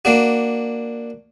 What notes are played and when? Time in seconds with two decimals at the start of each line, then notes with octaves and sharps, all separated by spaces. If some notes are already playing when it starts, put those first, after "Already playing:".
0.05 A#3 D4 F#4